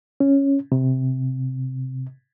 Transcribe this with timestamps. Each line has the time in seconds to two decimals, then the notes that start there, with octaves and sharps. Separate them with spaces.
0.20 C#4
0.72 C3